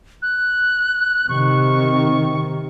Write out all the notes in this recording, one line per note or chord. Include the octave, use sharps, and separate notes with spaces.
F#6
C3 D#3 C#6